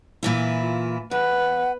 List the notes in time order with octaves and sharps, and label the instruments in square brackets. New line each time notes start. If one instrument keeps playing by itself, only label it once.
[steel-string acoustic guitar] A#2 E3 E4
[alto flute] F4
[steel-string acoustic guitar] E2 [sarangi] B4 [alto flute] F#5